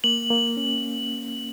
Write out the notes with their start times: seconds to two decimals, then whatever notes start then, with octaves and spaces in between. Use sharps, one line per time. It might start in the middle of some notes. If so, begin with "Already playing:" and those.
0.04 A#3 F#7
0.30 A#3
0.57 C#4